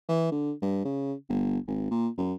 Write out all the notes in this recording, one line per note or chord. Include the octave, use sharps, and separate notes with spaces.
E3
D3
G2
C#3
G1
G#1
A#2
F#2